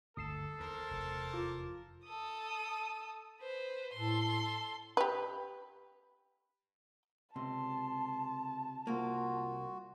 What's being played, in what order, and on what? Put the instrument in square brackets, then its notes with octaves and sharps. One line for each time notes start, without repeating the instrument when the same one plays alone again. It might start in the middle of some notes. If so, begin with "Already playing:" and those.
[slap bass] G1 D2 [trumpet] A4 [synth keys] D#6 C7 E7
[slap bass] D#2 [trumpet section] A#4 C5 A5
[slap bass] F1 E2
[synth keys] F4 D6
[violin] A4 D#6
B4 C5
[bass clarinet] A2 [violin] A4 C6
[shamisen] G4 B4
[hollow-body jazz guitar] C#2 C3 [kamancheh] A5 [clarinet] C6
[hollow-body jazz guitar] C2 A#3 [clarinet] F4 [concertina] F#4